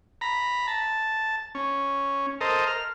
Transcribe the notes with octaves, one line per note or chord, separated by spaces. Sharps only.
A#5 B5
A5
C#4
A4 A#4 C5 D#5
F6